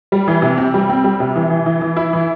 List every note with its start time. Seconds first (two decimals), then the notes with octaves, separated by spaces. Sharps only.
0.12 G3
0.28 E3
0.42 C3
0.58 C4
0.74 G3
0.89 C4
1.04 G3
1.20 C3
1.36 E3
1.50 E3
1.66 E3
1.81 E3
1.96 E4
2.13 E3